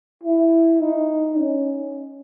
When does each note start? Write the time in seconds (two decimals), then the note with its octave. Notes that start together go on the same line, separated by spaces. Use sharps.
0.23 E4
0.80 D#4
1.38 C#4